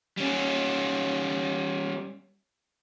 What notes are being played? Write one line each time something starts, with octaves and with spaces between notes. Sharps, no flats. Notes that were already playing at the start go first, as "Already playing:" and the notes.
G3 C#4